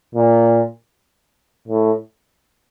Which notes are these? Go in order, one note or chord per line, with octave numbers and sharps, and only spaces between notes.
A#2
A2